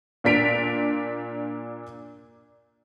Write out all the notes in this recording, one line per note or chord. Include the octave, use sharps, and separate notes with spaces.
A#2 D4 B6 D7 F7